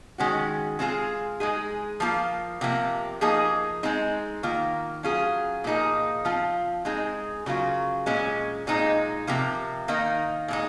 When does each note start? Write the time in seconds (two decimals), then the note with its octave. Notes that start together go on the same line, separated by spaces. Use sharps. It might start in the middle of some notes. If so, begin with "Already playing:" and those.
0.18 D#3 G#3 C#4 F#4
0.79 G#3 C4 F4 G#4
1.40 G#3 D#4 G#4
2.00 F3 A#3 F4
2.61 C3 F3 A#3
3.21 F3 A#3 D#4 G#4
3.83 G#3 C4 D#4
4.43 D#3 A#3 F4
5.03 F#3 C#4 F4 G#4
5.64 A#2 F3 A#3 D#4 G#4
6.25 F3 C4 F4
6.85 G#3 C4 D#4 G#4
7.46 C#3 F#3 A#3 F4
8.06 A#2 G#3 C#4
8.67 A#2 G#3 C4 D#4
9.27 C3 F3 A#3
9.88 D#3 A#3 D#4
10.48 A#2 G#3 D#4